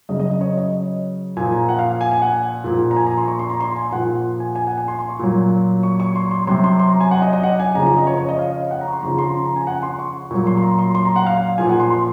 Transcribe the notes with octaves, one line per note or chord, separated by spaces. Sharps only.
C#3 F#3 D#5
D#5
D#5
C#5
D#5
A#2 F3 G#5
A#5
F#5
F5
G#5
G#5
F#5
A#2 F3
A#5
G#5
A#5
C6
C#6
C6
A#5
C6
G#5
A#2 F3 F#5
G#5
G#5
F#5
G#5
C6
C6
C#6
A#2 F#3
C#6
C#6
C6
C6
C3 F#3 C6
C6
C6
A#5
G#5
F#5
D#5
D#5
F#5
G#5
C#3 F3 A#5
A#5
D#5
C#5
C#5
D#5
F5
F#5
A#5
C#6
C6
C#3 F3 A#5
C6
A#5
A#5
G#5
F#5
C6
C#6
A#2 F#3 C#6
C6
C6
A#5
C6
C6
A#5
F#5
F5
A#2 F3 G#5
F#5
C6
C6